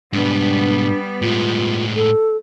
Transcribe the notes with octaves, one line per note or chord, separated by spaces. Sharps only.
G#2 B2 G3 B3 D4
A2 G#3 F4
A4